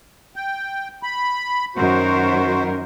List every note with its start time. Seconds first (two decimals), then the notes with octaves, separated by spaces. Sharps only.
0.36 G5
1.03 B5
1.76 F#2 D#3 F#4 A#4 C5